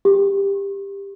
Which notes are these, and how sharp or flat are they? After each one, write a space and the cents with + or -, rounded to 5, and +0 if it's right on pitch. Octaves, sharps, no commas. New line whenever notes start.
G4 +20